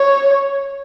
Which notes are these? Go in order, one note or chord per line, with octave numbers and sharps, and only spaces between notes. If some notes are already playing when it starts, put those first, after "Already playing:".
Already playing: C#5